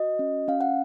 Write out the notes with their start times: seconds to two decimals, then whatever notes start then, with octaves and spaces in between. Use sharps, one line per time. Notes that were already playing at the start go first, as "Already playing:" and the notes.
Already playing: F#4 D#5
0.19 C#4
0.48 C#4 F5
0.61 F#5